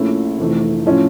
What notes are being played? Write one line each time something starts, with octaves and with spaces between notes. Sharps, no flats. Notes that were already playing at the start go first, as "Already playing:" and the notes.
Already playing: A#1 A#2 A3 C#4 E4
F1 F2 E3 A3
A2 F3 C#4